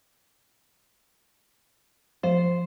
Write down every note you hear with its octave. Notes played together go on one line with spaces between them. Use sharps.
F3 C5